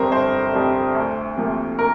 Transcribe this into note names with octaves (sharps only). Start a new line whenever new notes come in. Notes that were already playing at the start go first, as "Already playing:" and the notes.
Already playing: G1 F2 C3 G3 A#4 C5
G1 C5
F2 C3 G3
D2
C3 F3 A#3
A#4